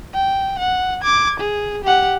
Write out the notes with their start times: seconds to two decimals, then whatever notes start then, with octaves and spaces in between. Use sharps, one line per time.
0.14 G5
0.59 F#5
1.02 D6 G#6
1.40 G#4
1.84 G4 F#5